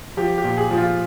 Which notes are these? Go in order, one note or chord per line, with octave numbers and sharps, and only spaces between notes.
F3 G4
G4
A#2
G#4
F3
F4